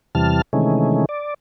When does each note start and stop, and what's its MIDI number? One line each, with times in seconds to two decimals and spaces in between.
0.15 0.42 40
0.15 0.42 48
0.15 0.42 52
0.15 0.42 55
0.15 0.42 81
0.15 0.42 89
0.53 1.05 48
0.53 1.05 51
0.53 1.05 52
0.53 1.05 56
0.53 1.05 57
0.53 1.05 61
1.09 1.34 74